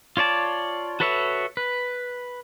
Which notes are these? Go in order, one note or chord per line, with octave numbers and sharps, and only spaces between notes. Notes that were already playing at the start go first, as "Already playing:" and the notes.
F4 C#5 D5 A5
F#4 A4 B4 C#5 E5
B4